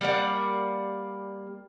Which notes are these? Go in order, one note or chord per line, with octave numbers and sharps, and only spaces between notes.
G3 A#3 D5 F#5